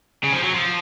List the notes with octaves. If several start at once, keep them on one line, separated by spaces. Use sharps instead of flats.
C#3
F3
F#3
F3